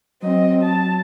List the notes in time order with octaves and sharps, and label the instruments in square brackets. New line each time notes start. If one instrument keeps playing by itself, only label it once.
[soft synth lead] F#3 [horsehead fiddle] C4 D#5
[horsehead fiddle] A5